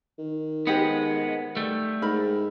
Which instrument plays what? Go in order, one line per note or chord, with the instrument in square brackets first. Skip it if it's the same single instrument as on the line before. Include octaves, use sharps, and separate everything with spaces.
[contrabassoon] D#3
[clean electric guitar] G#3 B3 [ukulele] D#4 G4 C5
[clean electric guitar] G3 A3
[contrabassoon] G#2 [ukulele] A#4 B5